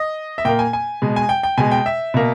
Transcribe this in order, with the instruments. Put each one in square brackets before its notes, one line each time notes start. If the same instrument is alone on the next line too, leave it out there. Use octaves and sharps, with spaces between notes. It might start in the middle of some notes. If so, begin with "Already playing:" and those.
Already playing: [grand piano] D#5
E5
A#2 A#3 G5
G#5
G#5
B2 G#3
G#5
G5
G5
B2 G#3 G#5
G5
E5
B2 A#3